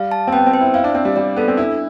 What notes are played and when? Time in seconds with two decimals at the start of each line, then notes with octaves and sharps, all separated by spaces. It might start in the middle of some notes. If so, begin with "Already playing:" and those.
Already playing: G3 F5
0.12 A5
0.27 C4
0.33 B3 G5
0.47 C4
0.54 C5
0.61 E4
0.74 E4 F5
0.84 D4
0.95 C4 F5
1.05 G3
1.16 G3 D5
1.36 B3 A4
1.48 C4
1.57 D4 E4